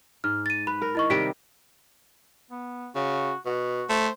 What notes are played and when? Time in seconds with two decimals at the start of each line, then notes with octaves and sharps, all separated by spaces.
0.24 G#2 F6
0.46 A6 D#7
0.67 B4 B5
0.82 A#4
0.95 E4 D#5 C#6
1.10 C3 D#3 G3 B6 D7
2.51 B3
2.95 C#3 F#4
3.45 B2 F#4
3.89 A3 C5